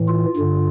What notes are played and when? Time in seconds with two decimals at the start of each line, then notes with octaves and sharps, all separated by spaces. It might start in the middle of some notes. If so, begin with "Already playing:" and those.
Already playing: A2 E3
0.08 F4
0.36 G2 D3